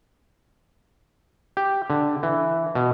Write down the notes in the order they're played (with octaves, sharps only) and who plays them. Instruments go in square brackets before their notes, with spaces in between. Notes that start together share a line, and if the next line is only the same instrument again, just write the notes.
[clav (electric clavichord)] G4
D3
E3
B2